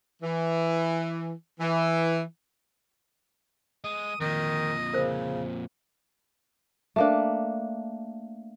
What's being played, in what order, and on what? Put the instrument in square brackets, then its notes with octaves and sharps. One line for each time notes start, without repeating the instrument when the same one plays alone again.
[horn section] E3
E3
[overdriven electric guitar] G#3 [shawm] D#6
[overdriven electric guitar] F2 A#2 [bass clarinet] D#3 [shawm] D#5
[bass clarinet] C#3 [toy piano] A#4 C5
[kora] A3 A#3 D4